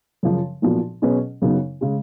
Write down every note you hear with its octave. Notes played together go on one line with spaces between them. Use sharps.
F#2 C#3 F3
B1 A#2 F3 B3 F#4
B2 F#3 C#4 G#4 B4
F#2 C#3 F#3 B3 D#4
C#3 G#3